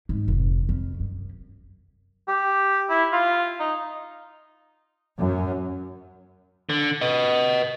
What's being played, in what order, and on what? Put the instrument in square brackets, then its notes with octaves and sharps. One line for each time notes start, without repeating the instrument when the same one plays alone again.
[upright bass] G#2
F1
F2
F#2
[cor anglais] G4
E4
F4
D#4
[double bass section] F#2
[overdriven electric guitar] D3
B4 D#5